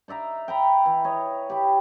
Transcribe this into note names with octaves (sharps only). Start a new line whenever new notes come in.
D#4 D5 E5 A#5
G5 A#5 B5
E3
C#5 D#5
G4 B5